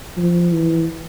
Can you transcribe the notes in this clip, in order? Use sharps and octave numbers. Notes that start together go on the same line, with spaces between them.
F3
E3